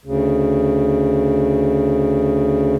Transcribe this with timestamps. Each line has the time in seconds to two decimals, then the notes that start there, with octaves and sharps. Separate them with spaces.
0.05 D2 C#3